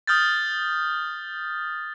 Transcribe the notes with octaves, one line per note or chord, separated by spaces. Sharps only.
D#6 F6 G6 A6